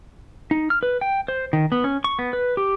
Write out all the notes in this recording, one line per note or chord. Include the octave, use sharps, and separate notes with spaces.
D#4
F6
B4
G5
C5
D#3
B3
C#4
C#6
B3
B4
G4